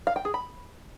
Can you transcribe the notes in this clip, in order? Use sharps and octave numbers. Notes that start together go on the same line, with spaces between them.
F5
G5
G#4
B5